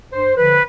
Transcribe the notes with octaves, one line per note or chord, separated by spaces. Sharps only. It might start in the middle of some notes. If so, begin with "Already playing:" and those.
G2 C5
D3 F3 B4